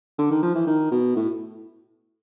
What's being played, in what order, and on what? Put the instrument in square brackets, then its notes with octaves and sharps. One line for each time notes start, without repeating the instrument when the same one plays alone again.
[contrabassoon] D3
D#3
F3
E3
D#3
B2
A2